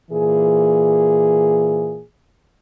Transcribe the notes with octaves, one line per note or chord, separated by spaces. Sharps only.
A#2 E3 G#4